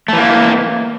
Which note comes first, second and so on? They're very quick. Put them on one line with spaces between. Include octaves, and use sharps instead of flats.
A3 E3 A#3